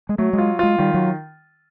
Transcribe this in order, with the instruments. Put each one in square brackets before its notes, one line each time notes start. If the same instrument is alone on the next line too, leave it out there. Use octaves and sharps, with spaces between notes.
[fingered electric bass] G#3
[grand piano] F#3 [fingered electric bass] A3
[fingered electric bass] G#3
[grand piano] F4
[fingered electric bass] G#3 [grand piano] F4
[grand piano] D#3 [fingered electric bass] G3
[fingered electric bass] F#3